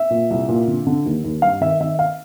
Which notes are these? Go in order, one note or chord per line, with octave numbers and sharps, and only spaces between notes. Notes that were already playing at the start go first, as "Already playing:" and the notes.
Already playing: E5
A#2
C2
A#2
D3
D3
D#2
D#2
G2 F5
D#3 E5
D#3 E5
F5